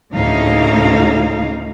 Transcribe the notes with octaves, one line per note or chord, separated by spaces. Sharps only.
D2 A2 C#3 A#3 D#4 F5